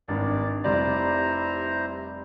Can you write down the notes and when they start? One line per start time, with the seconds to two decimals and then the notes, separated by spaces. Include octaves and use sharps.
0.08 G#1 G2 D5
0.64 F1 G3 E4 C5 D5 A#5